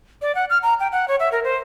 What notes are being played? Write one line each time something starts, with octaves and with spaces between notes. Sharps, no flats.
D5
F#5
F6
A#5
G5
F#5
C#5
E5
A#4
C5